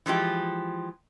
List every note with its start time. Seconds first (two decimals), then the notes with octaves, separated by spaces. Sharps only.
0.06 E3 F3 G#3 G4